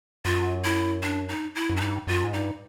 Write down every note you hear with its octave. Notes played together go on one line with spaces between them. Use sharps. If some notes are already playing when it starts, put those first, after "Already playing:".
F#2 F4
E4
D4
D#4
E4
F#2
D4
G2 D#4
F#2 F4
G#2
G2 D#4